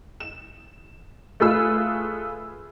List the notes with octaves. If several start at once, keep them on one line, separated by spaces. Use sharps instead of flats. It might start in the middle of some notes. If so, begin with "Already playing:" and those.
E7
A3 F4 G#4 B4 E6